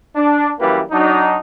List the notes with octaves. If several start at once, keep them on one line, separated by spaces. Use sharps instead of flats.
D4
F#2 E3 G3 A#3 E4 B4
F#3 D4 D#4